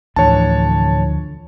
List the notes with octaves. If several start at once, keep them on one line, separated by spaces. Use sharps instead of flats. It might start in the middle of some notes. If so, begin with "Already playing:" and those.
D2 A2 D3 E3 F3 C#5 A5